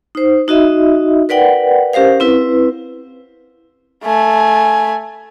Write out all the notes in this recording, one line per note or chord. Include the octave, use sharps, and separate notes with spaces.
D#4 C5
D#4 F#4 D#5 E5
A#4 B4 D5 F#5 G5
C#4 G4 A#4 C5 F5
C4 E4 B4
A3 G#5